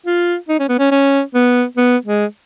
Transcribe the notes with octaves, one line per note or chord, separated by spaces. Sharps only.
F4
D#4
C#4
B3
C#4
C#4
B3
B3
G#3